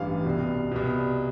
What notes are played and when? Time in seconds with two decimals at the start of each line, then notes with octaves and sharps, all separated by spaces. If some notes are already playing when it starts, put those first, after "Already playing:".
Already playing: A1 G2 E3 F5
0.25 C2 B2
0.71 C2 B2